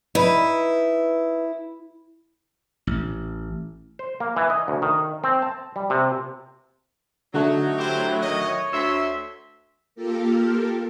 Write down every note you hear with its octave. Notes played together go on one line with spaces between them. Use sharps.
D#4 E4 B4
A1
C5
A#3
E3
D#5
D2
D#3
C4
A5
G3
C3
D3 F#3 A3 D#4 F#4
E4 G4 C5
A2 D#3 C#5 D#5
D2 E5 C6 E6 B6
A#3 F4 G4 A4 A#4